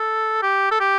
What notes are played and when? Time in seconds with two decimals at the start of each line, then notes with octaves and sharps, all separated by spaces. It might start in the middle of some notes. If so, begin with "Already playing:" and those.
Already playing: A4
0.43 G4
0.71 A4
0.80 G4